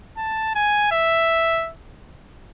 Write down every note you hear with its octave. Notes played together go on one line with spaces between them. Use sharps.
A5
G#5
E5